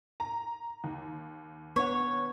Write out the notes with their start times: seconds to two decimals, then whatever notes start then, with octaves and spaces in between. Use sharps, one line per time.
0.20 A#5
0.84 D#2
1.76 B3 D4 C#5 F#5